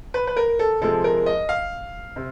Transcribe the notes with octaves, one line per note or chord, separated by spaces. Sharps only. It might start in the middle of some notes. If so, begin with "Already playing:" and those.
B4
B4
A#4
A4
C3 F3 G#3 A4
A#4
D#5
F5
C3